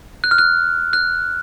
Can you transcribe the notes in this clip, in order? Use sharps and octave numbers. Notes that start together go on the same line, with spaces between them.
F#6
F6
F#6
F#6